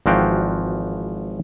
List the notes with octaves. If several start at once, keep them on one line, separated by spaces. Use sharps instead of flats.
G#1 E3 F3 F#4 F5 G5